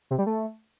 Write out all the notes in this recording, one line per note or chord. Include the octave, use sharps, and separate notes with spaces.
C3
G3
A3